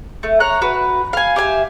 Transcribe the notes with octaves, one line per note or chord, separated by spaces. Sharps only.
A3
C#5 A#5 F#6
F#4 B4
F5 G#5
G4 E5 G#5